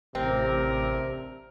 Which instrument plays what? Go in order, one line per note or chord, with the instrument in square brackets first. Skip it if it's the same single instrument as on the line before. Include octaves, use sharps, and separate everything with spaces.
[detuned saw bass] A1 [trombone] C3 [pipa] C4 [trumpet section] D4 A#4